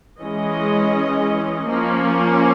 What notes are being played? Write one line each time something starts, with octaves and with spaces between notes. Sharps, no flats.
E3 G#3 C#4 D#5
F3 A#3 C#4